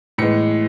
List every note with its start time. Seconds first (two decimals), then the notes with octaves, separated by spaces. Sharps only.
0.18 A2 E3 G#3 B3 C#7